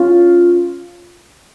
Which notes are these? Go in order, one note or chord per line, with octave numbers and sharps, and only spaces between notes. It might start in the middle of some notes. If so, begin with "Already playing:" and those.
Already playing: C#4 F4